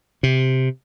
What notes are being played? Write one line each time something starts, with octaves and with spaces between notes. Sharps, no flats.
C3